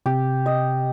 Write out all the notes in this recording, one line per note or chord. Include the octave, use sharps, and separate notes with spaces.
C3 G4
D#5